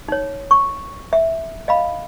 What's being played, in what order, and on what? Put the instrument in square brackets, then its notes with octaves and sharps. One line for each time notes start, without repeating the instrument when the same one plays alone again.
[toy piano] D#4 C#5
C#6
E5
D#5 F5 B5